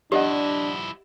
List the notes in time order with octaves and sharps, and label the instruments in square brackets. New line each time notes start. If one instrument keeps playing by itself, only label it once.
[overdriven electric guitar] F3 E4 [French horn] D4 [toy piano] G4 [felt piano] D5 D#5 F#5